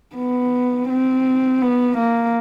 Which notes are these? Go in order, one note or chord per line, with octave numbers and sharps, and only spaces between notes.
B3
C4
B3
A#3